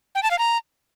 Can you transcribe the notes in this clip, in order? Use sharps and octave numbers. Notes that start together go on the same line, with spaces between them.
G5
A5
F5
A#5